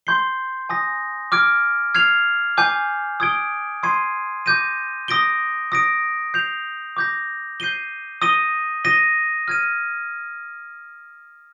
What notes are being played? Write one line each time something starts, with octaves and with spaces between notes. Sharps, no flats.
C6 G6 C7 G7
G#5 D#6 A#6
D6 F6 G#6 D7
F6 G#6 C7 F7
G#5 D6 G6 C7
D#6 G#6 D7 G7
C6 D#6 G#6 C7 D#7
D6 G6 A#6 D#7
D#6 A#6 D7 G7
D#6 A#6 D7
G6 C7 F7
D6 G6 A#6
G6 C7 D#7 G7
D#6 A#6 D#7 G7
D#6 A#6 D#7 G7
F6 G#6 D#7